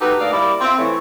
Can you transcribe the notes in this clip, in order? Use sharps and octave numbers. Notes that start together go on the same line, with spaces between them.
D#4 F#4 G4 A4 B4
D2 A#3 D#4 A4 D5 F5
G3 A#3 E4 D5
C4 F4 E5
E3 A3 C#5